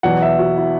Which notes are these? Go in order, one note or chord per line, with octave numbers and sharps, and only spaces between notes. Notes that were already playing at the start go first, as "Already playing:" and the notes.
E2 B2 F#3 F#5
E5
F#4
E4